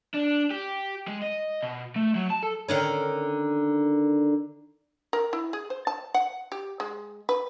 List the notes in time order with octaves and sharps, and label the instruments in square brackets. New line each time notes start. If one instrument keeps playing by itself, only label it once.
[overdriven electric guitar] D4
G4
G#3
D#5
B2
A3
F#3
A5
A4
[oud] D3 D#3 C#4
[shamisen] A#4
E4
G#4
C5
A5
F#5
G4
G#3
B4